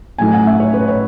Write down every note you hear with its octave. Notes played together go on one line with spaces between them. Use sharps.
A2 F#3 A3 D#4 G#5
F#5
E5
C#5
B4
C#5